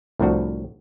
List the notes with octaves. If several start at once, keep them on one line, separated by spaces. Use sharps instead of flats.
C2 A2 F3 D4 F#4